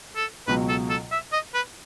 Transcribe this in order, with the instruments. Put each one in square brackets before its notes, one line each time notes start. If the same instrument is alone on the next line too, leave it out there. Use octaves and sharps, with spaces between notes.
[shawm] A4
[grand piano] C#2 B2 F#3 [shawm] B4
[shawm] A4
A4
E5
D#5
B4